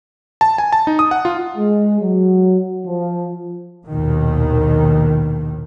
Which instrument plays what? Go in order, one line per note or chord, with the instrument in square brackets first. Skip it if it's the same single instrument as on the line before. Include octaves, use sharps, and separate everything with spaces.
[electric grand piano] A5
G#5
A5
D#4
D#6
F#5
F4
[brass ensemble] G#3
F#3
F3
[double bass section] A#1 D#2 B2 D#3